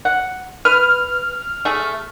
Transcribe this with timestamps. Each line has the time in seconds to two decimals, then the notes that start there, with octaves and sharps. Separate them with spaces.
0.05 F#5
0.65 B4 F6
1.65 A3 G#4